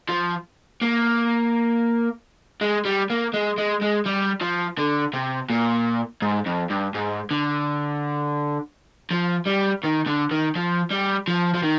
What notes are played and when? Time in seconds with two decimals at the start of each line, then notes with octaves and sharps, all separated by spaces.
0.09 F3
0.81 A#3
2.61 G#3
2.85 G3
3.10 A#3
3.34 G#3
3.58 G#3
3.82 G#3
4.06 G3
4.41 F3
4.78 D3
5.14 C3
5.50 A#2
6.22 G#2
6.46 F2
6.70 G2
6.95 G#2
7.31 D3
9.11 F3
9.47 G3
9.83 D#3
10.06 D3
10.31 D#3
10.56 F3
10.91 G3
11.28 F3
11.54 F3
11.63 D#3